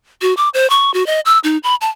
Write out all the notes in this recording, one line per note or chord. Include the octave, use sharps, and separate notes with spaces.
F#4
D6
C5
C#6
F#4
D#5
E6
D#4
B5
A5